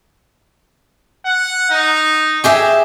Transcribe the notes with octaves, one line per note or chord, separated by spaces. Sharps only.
F#5
D#4
G4 G#4 E5